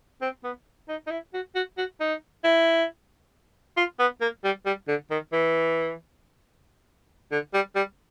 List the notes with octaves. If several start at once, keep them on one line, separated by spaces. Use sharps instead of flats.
C4
B3
D#4
D#4
E4
F#4
F#4
F#4
D#4
E4
F4
B3
A#3
G3
G3
D3
D#3
E3
D3
G3
G3